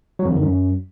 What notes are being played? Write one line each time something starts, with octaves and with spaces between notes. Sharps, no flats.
F#3
F2
D3
D#3
F#2